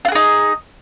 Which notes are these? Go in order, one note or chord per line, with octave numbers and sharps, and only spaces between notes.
D#4 F4 F#4 G#4